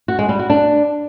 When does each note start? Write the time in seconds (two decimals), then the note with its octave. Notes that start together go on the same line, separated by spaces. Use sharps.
0.08 F#4
0.19 G#3
0.29 G3
0.39 F#4
0.50 D4